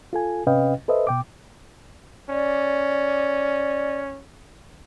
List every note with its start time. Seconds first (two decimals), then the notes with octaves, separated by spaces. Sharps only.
0.13 F4 A4 G#5
0.47 C3 C#4 B4 D#5 F5 G5
0.88 A4 B4 C5 D#5 E5
1.07 B2 G5 D6
2.29 C#4 D5